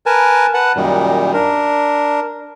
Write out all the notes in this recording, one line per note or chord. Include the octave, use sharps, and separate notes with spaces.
A#4 B4 G#5 A5
B4 F#5 A5
F#2 A#2 D#3 G3
D4 A#4